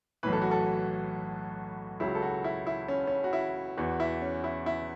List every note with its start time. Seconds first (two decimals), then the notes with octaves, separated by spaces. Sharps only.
0.23 B1 A2 E3 B4
0.33 A4
0.42 F#4
0.51 A4
2.00 C#2 C#3 F#3 E4
2.15 A4
2.22 F#4
2.44 E4
2.67 E4
2.88 C#4
3.07 C#4
3.24 F#4
3.33 E4
3.77 E2 E3 F#4
4.00 E4
4.22 C#4
4.44 E4
4.66 E4